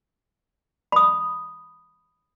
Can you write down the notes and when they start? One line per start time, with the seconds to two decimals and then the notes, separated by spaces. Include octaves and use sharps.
0.92 B5 D#6